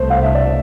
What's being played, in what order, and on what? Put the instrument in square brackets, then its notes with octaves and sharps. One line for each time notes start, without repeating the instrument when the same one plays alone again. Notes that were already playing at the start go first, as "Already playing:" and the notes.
Already playing: [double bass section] C2 B2 A3 [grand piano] C5
[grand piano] F5
E5
D5
E5